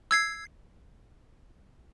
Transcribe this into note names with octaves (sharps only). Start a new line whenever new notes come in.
E6 G#6 C7